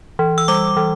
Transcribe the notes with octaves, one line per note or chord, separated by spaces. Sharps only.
E3
E6
G3 D6
E3